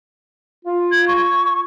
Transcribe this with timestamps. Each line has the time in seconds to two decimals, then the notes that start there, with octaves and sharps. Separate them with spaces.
0.66 F4
0.92 G#6
1.08 C#6